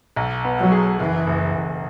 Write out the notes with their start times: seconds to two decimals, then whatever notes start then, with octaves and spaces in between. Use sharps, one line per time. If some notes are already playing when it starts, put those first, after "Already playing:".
0.16 B1
0.45 B3
0.58 F#3
0.72 G#4
1.00 F#1 E3
1.27 F#1
1.53 F#1